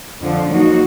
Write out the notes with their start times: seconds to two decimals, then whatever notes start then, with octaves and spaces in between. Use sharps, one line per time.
0.22 F2 D3 F3
0.51 F#3 A#3 D#4 F#4